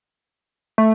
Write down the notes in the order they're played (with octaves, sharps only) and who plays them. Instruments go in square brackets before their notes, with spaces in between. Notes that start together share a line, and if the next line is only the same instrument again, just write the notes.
[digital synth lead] A3